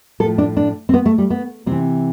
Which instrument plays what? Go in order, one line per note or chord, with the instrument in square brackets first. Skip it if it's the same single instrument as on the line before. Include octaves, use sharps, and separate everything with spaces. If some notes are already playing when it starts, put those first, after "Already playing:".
[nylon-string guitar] A2 F3 A4
D4
D4
C4
B3
A3
G3
B3
C3 E3 C4